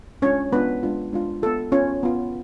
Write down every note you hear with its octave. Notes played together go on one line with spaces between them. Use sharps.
G#3 C#4 D4 F4 C#5
G#3 B3 D4 F4 B4
G#3 D4 F4
G#3 D4 F4
B3 F4 A4
B3 C#4 F4 C#5
B3 F4